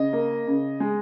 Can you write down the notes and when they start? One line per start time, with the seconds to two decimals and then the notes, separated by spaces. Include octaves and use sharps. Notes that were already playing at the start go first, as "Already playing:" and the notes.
Already playing: C#3 D#5
0.13 A#3
0.47 C#3
0.80 G#3